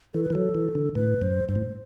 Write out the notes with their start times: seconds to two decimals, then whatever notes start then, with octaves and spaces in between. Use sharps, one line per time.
0.14 E3 A4
0.23 B4
0.30 E3
0.33 F#3 A4
0.55 E3
0.75 D3
0.95 A2 B4
1.22 F#2 C5
1.49 G2 C5
1.55 A2